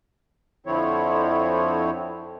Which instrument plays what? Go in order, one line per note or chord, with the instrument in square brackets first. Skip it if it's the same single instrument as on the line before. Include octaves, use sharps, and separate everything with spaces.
[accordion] F2 D3 F3 C4 E4 C#5